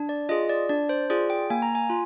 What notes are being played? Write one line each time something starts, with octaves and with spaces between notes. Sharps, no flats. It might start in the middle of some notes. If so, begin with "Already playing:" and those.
Already playing: D4
D5
F4 G#4 D#5
D5
D4 D5
C5
F4 G#4 D5
G5
A#3 G#5
A#5
G#5
F4